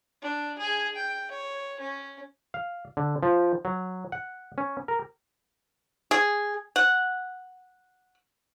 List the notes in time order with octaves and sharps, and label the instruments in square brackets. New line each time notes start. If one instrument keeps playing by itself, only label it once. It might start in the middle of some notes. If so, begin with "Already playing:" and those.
[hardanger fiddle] D4
G#4 G#5
G5
C#5
C#4
[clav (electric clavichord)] F5
D3
F3
F#3
F#5
C#4
A#4
[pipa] G#4
F#5